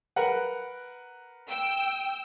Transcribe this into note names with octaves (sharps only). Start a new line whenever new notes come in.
A#4 B4 F#5
G5 E6